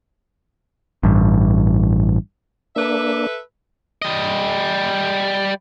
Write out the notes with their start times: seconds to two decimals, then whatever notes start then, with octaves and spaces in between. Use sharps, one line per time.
1.03 A1 G2
2.76 A#3 D4 A4 B4 E5
4.02 G3 D#5